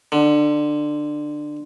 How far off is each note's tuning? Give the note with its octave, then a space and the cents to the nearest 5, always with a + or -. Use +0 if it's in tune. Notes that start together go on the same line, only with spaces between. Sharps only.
D3 +20